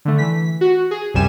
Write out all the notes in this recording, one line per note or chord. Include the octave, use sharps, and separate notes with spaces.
D3 A3
E3 B6
F#4
G#4
C2 F#2 C3 G3 G#5 E7